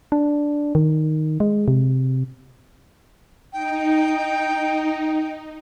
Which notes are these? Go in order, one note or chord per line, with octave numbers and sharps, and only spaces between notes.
D4
D#3
G#3
C3
D#4 G5